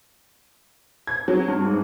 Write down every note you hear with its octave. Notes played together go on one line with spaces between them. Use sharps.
G#6
F#3
G2
G#2